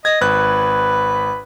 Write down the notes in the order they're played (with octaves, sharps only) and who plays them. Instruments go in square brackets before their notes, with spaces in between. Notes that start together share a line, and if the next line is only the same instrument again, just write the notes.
[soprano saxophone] D#5 [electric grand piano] G#6
[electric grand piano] G#1 F#6 [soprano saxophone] B4